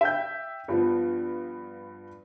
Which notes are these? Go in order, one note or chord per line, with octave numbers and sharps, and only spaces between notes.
E5 G5 G6
G2 F3 B3